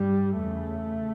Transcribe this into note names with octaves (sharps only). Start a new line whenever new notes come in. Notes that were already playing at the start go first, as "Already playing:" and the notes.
Already playing: G2 G3
E2 C#3 A3